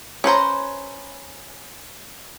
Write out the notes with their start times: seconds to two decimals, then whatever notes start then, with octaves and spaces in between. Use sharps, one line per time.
0.24 C#4 B4 C5 A#5